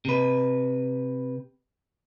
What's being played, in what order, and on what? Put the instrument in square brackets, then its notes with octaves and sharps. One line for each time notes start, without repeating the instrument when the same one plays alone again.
[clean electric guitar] C3 B4